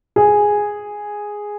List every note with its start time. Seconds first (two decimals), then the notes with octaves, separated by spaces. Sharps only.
0.16 G#4